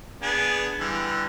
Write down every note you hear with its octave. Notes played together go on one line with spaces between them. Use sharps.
B3 D4 G#4
D3 E3 G3